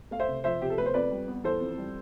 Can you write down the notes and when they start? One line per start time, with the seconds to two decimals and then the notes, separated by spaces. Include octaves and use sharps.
0.11 A3 F5
0.19 C5 E5
0.28 C3
0.44 F3 C5 E5
0.62 C3 G4
0.70 A4
0.78 A3 B4
0.86 C5
0.94 F2 B4 D5
1.11 G3
1.28 B3
1.44 E3 A4 C5
1.61 F2
1.78 G3